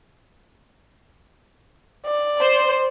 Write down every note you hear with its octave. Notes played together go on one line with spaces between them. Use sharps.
D5
C5